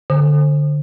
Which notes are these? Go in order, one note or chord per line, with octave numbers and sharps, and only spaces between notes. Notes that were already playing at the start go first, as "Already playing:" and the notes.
D3